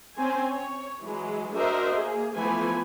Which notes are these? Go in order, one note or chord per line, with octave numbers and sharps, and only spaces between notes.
C4 C#4 G#5
C#5
E3 F#3 G#3
D4 F#4 A#4 C5 D#5 E5
A#3 G#4
E3 F3 A3 B3 B4 G#5